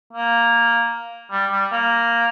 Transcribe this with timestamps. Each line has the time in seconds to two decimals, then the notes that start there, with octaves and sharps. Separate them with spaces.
0.13 A#3
1.32 G3
1.52 G3
1.72 A#3